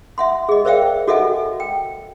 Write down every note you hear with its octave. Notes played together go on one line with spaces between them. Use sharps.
E5 F#5 C6
G#4 D#5
A#4 C5 D5 E5 F5 G5
F#4 A4 D#5 E5 F#5 G#5
G5